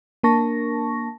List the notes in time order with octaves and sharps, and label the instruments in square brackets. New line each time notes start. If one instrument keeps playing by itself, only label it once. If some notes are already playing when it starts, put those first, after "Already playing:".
[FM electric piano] A#3 D4 A#4 A5 C#6 A#6